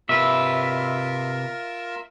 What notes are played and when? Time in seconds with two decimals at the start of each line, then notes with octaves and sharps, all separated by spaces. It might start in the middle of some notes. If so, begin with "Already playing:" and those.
0.09 C3 F4 A#4 B4 E5